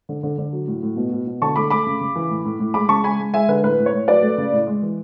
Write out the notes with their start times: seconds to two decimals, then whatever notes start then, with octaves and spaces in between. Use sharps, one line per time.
0.09 D3
0.23 D3
0.38 D3
0.53 F#3
0.67 A2
0.83 A2
0.96 B2
1.12 B2
1.27 B2
1.42 D3 A5 C#6
1.56 A3 B5 D6
1.70 A3 B5 D6
1.86 C#3
2.01 C#3
2.16 E3
2.30 A2
2.45 A2
2.59 A2
2.74 G#3 B5 D6
2.89 C#3 A5 C#6
3.04 G#3 G#5 B5
3.20 G#3
3.34 G#3 E5 G#5
3.48 D3 B4
3.63 A2 B4
3.78 A2
3.86 C#5
3.93 A2
4.08 F#3 B4 D5
4.23 A3
4.38 C#3
4.52 A2
4.67 G#3
4.82 E3